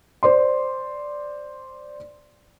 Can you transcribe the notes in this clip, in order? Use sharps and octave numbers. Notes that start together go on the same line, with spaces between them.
C5 D5 C6